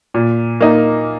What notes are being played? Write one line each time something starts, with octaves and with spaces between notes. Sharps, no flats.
A#2
A#3 D#4